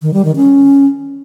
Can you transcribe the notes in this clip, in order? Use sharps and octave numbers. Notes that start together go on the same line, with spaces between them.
D#3
G3
D#3
C#4